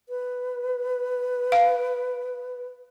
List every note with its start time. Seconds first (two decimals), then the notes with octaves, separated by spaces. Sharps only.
0.09 B4
1.52 F5